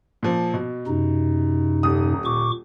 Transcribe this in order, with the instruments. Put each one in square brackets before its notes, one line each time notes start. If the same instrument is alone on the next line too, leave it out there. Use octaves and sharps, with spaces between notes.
[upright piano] A#2 F3
B2
[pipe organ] F#2 C3 D#4
[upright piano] D#1 D#6
[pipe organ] A#2 C#6 D6